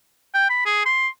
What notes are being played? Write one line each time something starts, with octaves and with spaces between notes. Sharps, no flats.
G5
B5
G#4
C6